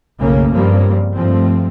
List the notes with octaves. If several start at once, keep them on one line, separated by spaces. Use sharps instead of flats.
F#1 B1 C#3 A3 A#3 C#4
G2 C#3 F3 G3 A#3 C4
G2 F3 A3 C4